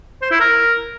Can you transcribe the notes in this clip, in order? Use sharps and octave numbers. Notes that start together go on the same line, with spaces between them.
C5
E4
A#4